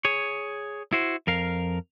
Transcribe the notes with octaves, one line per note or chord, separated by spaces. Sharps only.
G#4 C#5
E4 F#4 C5
F2 A#4 F5